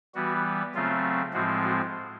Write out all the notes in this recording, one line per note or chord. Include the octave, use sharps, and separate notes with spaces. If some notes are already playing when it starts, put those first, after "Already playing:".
E3 G3 B3 F#4
C#3 F#3 A3 C4 F4
A2 F3 G#3 C4 F#4
F#4